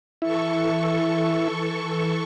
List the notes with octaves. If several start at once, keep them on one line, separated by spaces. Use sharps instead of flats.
E3 E4 A4 C#6